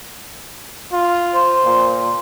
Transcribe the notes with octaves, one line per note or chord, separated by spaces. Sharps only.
F4
C5
A#2